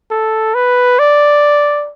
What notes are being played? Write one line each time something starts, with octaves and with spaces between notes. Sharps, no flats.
A4
B4
D5